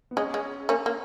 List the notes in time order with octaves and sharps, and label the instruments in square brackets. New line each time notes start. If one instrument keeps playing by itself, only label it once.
[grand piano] B3
[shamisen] G#3 [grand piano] C#4
[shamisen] G#3
A#3 C#4
A#3